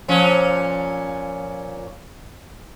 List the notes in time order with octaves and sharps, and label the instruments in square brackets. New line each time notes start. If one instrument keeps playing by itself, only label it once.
[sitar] A#2 F3 C#4